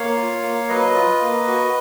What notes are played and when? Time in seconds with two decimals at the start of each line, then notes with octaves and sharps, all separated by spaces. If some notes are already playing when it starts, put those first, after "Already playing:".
Already playing: A#3 C#5 F5
0.16 F4
0.42 A#3
0.69 F#3 B4 D#5
0.95 F4
1.22 A#3
1.47 F#4